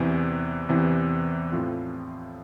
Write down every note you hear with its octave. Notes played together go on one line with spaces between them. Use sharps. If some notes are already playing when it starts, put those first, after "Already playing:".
Already playing: E2 C3 E3
E2 C3 E3
A2 F3 C4 F4